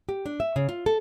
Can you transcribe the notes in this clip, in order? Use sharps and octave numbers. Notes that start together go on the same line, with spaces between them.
G4
D4
E5
C#3
F4
A4